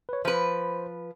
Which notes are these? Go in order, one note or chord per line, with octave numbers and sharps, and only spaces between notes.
B4 C#5
F3 B4 C5